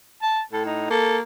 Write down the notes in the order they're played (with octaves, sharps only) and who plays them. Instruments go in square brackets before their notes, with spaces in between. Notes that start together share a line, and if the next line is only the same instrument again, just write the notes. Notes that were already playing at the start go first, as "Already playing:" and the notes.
[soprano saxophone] A5
[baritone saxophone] A2 [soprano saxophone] A4
[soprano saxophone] D#4
[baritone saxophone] A#3 [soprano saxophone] A4